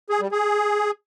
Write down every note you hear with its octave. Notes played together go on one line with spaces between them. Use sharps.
G#4
G3
G#4